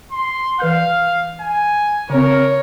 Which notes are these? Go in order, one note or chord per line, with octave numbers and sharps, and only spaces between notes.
C6
E3 B4 F5 G6
G#5
C#3 C4 A#4 C#5